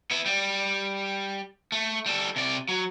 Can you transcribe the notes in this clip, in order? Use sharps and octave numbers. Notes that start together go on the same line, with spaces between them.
B3 E4
G3
A3
G3 A4
C3 D5
F#3